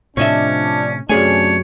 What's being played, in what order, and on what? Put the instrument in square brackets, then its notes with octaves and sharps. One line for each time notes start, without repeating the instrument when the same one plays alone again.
[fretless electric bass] A2 C3 [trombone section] F3 D4 [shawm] C#4 [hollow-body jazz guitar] C#5 D#5 E5
[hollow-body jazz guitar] F#2 G#4 G#5 [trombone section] C3 C#4 D4 [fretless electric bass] A3 [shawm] C#5